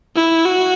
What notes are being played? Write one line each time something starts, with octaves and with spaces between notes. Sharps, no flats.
E4
F#4